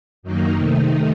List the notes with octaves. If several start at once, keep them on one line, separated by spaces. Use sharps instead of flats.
F#2 D#3 F#3 A#3 D#4
C3 D#3 A3 D#4